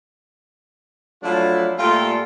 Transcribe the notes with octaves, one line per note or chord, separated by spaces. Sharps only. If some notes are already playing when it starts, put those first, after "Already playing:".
F3 F#3 A3 D4 E4 F4
A#2 G3 A3 F4 A4 G5